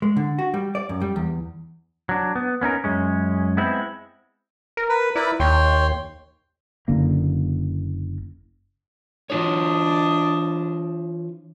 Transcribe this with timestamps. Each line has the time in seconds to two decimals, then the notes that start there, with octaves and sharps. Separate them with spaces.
0.02 G#3
0.16 D3
0.39 F#4
0.54 G3
0.75 D5
0.89 F#2
1.02 G3
1.16 E2
2.09 F#3 D4
2.36 B3
2.61 B3 C#4 D#4 A#4
2.84 F#2 G#3 C#4
3.57 G#3 B3 C4 E4
4.77 A#4
4.89 B4
5.16 E4 A#4 B4 D5
5.40 D#2 C#5 G5 C6
6.88 F#1 D3 A#3
9.30 E3 D4 F4 C#5 D#5